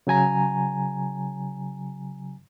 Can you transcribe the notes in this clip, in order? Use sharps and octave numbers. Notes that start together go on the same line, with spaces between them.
C#3 F#3 G#5 A#5